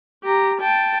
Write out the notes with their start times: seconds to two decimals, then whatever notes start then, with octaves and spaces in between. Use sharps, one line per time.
0.24 G4 A#5
0.60 G5 A5